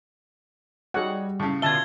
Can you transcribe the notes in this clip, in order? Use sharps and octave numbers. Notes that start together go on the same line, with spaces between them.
G3 D#4 F#4 G#4 C#5 F#5
A2 C#3
B2 D3 F4 E5 A5 G#6 G7